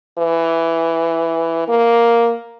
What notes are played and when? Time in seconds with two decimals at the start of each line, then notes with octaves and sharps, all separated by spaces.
0.18 E3
1.68 A#3